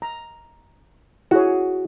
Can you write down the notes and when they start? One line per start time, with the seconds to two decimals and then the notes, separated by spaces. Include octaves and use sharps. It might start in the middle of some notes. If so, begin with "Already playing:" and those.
0.02 A#5
1.31 E4 F#4 G#4 C#5